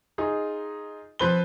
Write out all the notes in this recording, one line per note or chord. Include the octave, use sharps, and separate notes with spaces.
D#4 F4 G#4
F3 C4 B4 C6 G7